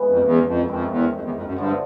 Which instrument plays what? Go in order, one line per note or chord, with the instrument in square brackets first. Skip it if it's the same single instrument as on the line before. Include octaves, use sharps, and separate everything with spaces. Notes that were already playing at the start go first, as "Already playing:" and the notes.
Already playing: [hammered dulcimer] C#3 E3 G#3 B3
[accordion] F2
E2
F2
[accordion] F2 [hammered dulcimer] D#3 G#3 C4 E4
[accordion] E2
F2
E2
F2
F#2
[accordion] G2 [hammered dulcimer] D3 F3 A3